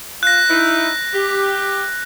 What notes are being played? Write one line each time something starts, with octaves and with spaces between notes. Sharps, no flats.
F4 F#6 A#6
D#4 E4
G4